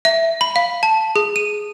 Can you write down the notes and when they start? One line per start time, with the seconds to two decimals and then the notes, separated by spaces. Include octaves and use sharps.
0.05 E5
0.41 B5
0.56 F5
0.83 A5
1.16 G#4
1.36 D#7